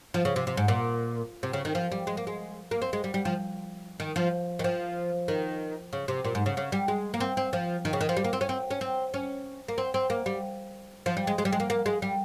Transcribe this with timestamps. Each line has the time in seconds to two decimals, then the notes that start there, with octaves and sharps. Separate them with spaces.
0.14 F3
0.25 C#3
0.36 C3
0.47 C3
0.57 G#2
0.68 A#2
1.43 C3
1.53 C#3
1.65 D#3
1.75 F3
1.92 G3
2.07 G#3
2.17 A#3
2.27 G#3
2.71 A#3
2.82 C4
2.93 G#3
3.04 G3
3.14 G3
3.25 F3
4.00 D#3
4.16 F3
4.59 D#3
4.64 F3
5.28 D#3
5.93 C#3
6.08 C3
6.24 A#2
6.35 G#2
6.46 C#3
6.57 C#3
6.72 G3
6.88 G#3
7.14 A#3
7.20 C4
7.37 C4
7.53 F3
7.85 D#3
7.93 C#3
8.01 D#3
8.09 F3
8.17 G3
8.24 A#3
8.33 C4
8.41 C#4
8.49 C4
8.70 C#4
8.81 C4
9.14 C#4
9.68 A#3
9.78 C4
9.94 C4
10.10 A#3
10.26 G3
11.06 F3
11.17 G3
11.27 G#3
11.38 G#3
11.45 G3
11.52 G#3
11.60 A#3
11.70 A#3
11.86 G#3
12.02 G3